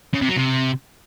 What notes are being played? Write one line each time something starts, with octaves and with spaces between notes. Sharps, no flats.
C#3
C3
F#3
C3